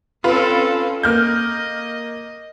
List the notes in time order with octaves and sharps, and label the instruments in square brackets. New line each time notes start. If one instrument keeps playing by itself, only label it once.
[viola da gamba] C4 C#4 A4 [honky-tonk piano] F4 B4
[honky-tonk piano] A#3 F6 G6 [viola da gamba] D#5